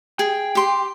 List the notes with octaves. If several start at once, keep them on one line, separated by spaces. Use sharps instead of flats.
G#4 G5
G4 C6